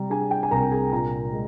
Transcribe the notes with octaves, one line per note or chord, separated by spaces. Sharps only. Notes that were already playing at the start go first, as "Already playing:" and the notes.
Already playing: C3 G3 A#5
D4 G#4 G#5
G5
G#5
C2 A#4 A#5
G#4 G#5
A#2 A#4 A#5
G#3